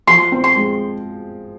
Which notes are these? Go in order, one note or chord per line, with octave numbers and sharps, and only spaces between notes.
F3 C6
C4
C6
G#3